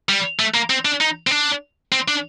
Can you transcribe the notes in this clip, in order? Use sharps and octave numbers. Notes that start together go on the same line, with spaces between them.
G3
A3
A#3
C4
D4
D#4
C4
D4
C4
D4